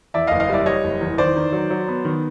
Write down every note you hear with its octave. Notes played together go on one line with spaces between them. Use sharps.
E2 D5 E5
D#5 F5
F#1
D#5 F5
G3 D5 E5
G3 C#5 D#5
F#1
E2
D#3 C5 D5
D#3
F#3
F#3
B3
D#3